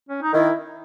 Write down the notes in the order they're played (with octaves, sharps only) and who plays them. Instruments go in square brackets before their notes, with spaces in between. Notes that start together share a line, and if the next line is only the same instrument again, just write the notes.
[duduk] C#4
D#4
[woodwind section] D#3 [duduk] E4